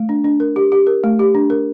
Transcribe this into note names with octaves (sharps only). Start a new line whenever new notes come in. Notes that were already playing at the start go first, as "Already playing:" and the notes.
Already playing: A3
D4
D4
A#4
G4
G4
A#4
A3
G4
D4
A#4